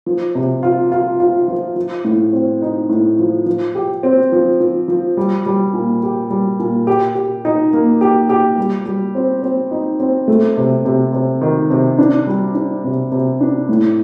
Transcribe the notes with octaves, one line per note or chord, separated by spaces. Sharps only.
F3
C3
F4
F4
F4
F3
F3
A2
C4
D#4
A2
F3
F3
G4
C4
F3
F3
F3
G3
G3
A#2
G4
G3
A#2
G4
G4
D#4
A#3
G4
G4
G3
G3
C4
C4
D#4
C4
A3
C3
C3
C3
D#3
C3
D4
G3
D4
C3
C3
D4
A2